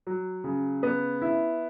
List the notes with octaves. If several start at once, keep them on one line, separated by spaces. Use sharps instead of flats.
F#3
C#3
B3
E4